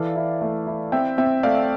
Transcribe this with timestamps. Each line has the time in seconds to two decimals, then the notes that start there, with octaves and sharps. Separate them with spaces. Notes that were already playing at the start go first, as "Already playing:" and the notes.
Already playing: E3 A4 D5 F5
0.16 E4
0.41 A3
0.67 E4
0.92 C4 E5 G5
1.18 C4 E5 G5
1.43 A3 D5 F5